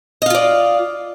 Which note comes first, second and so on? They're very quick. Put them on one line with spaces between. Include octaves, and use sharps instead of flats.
D#5 F5 F4 D5